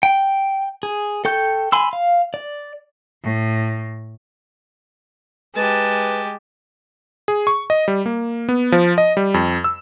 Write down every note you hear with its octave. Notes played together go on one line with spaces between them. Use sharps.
G5
G#4
A4 G5 C#6 G6
G#5 B5 C6 E6
F5
D5
A2
G#3 G4 B4 A5
G#4
C#6
D#5
G3
A#3
B3
F3
D#5
G3
F2
E6